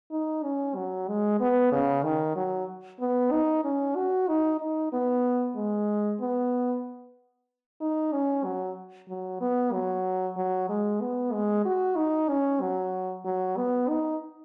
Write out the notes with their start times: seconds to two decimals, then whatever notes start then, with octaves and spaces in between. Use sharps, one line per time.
0.11 D#4
0.43 C#4
0.75 F#3
1.08 G#3
1.40 B3
1.72 C#3
2.03 D#3
2.36 F#3
3.00 B3
3.31 D#4
3.64 C#4
3.96 F#4
4.28 D#4
4.60 D#4
4.92 B3
5.56 G#3
6.20 B3
7.80 D#4
8.13 C#4
8.44 F#3
9.08 F#3
9.40 B3
9.73 F#3
10.37 F#3
10.69 G#3
11.00 B3
11.32 G#3
11.65 F#4
11.96 D#4
12.29 C#4
12.61 F#3
13.24 F#3
13.57 B3
13.89 D#4